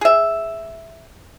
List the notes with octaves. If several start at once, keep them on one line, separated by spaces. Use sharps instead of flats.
G#4 E5